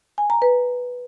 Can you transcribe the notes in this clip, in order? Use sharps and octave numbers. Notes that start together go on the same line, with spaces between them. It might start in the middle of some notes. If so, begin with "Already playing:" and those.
G#5
A#5
B4